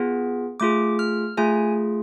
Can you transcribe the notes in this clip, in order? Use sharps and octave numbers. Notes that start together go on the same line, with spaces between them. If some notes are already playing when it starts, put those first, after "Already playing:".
Already playing: B3 F4 G#4
A3 F4 G#4 D6
F6
A3 F4 G#4 G#5